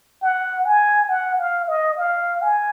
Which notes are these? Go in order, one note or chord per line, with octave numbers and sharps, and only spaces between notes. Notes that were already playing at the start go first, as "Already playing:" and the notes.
F#5
G#5
F#5
F5
D#5
F5
G#5